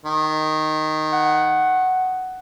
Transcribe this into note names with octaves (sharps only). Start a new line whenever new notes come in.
D#3
F#5